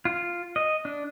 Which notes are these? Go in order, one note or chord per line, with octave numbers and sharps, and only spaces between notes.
F4
D#5
D4